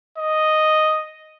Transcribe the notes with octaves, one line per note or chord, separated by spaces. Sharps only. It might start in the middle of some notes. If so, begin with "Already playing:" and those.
D#5